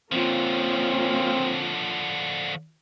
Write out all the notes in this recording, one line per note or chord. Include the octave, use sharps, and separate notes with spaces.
D3 F3 A#3 C4 C#4 F4